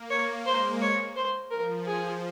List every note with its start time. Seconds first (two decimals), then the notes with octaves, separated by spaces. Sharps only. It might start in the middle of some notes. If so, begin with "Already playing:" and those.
Already playing: A#3
0.10 C#5
0.46 G#3 C5
0.81 C#5
1.16 C5
1.51 F3 A#4
1.87 G#4